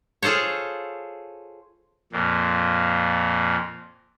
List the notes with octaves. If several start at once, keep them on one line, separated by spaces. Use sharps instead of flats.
F4 G#4 A4 C5 C#5
F2 A#2